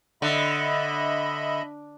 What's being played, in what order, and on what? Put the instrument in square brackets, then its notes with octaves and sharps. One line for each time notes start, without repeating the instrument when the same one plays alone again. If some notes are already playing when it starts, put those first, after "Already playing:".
[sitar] D3 [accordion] D#5 E5 B5